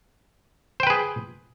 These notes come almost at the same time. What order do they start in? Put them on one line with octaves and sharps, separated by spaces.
C5 G5 B4 G#4